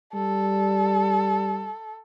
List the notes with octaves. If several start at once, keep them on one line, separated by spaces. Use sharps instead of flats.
G3 A4